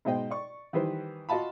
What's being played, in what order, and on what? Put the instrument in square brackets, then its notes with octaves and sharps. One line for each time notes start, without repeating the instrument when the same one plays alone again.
[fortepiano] G#2 B2 C5 D#5 G5
D5 C#6
D#3 E3 G3 B4 C5
F4 F#4 D#5 F5 A5 B5